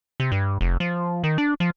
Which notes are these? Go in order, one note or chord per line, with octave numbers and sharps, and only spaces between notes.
C3
G2
F1
F3
D#3
D4
F3